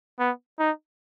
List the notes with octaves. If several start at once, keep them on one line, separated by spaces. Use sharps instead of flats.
B3
D#4